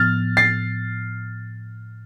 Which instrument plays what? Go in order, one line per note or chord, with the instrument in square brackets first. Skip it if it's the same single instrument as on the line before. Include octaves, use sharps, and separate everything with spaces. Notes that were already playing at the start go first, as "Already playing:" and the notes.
Already playing: [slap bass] A2 F3 B3 [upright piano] F6 A6
[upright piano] A6 C7